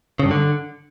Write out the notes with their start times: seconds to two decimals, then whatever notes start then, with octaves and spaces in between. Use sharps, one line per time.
0.19 C#3
0.25 G2
0.31 D3